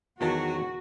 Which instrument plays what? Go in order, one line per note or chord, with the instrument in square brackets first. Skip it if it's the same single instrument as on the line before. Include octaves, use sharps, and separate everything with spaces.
[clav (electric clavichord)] E2 D#3 A5 [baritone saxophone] F#3 [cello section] F#4